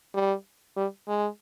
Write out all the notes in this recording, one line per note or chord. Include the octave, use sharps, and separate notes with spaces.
G3
G3
G#3